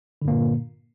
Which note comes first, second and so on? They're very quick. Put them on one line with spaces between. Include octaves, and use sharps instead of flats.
D3 G2 A#3 A#2